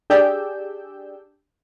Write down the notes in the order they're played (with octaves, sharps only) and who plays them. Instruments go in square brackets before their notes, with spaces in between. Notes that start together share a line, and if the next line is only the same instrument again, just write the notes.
[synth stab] D4 G4 G#4 D5 E6 G6